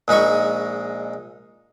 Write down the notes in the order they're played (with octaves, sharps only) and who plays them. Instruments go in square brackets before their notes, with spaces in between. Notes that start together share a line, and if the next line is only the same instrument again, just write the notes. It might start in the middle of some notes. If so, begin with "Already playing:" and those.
[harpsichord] A#1 G#3 D#4 B5 C#6